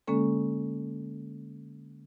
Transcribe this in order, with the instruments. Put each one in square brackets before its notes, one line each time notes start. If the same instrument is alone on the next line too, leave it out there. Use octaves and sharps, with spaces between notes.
[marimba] D3 G#3 A#3 C#4 A4